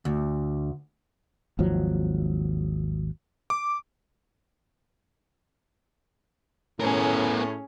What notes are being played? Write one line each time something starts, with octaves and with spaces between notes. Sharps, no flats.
D2
G#1 D#2 F3 F#3
D6
A2 B3 C#4 G#4 A#4